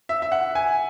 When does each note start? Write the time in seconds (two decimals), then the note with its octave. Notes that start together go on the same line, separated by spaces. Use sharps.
0.09 E5
0.22 E5
0.32 F#5
0.55 G#5